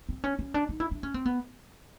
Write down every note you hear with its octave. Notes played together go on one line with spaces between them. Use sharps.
C4
C#4
C#4
D4
D#4
E4
D4
C#4
C4
B3